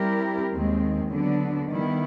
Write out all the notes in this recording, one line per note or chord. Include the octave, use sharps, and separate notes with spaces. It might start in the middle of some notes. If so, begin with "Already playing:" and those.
Already playing: G3 C4 E4 G4 A#4
D#2 D#3 G#3 C4
D3 F#3 B3 D4
D#3 G3 B3 E4